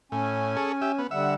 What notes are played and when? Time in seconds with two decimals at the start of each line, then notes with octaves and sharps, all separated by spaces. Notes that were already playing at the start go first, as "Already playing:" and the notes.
0.12 A2 C#4 G#5
0.57 G#4 A4 C#5
0.81 G4 E5
0.99 B3
1.11 D3 G3 E5 F#5